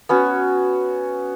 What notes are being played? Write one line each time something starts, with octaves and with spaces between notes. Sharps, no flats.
B3 C#4 F#4